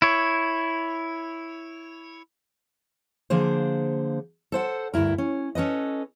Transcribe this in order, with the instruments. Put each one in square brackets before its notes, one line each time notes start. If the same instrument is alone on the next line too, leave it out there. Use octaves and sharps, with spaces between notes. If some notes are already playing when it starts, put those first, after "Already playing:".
[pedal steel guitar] E4 C#5
[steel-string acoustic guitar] D3 F3 A#3 G#4 C5
A4 C5 F#5
D2 G2 E4 A#4
C#4
C#4 A4 B4 D#5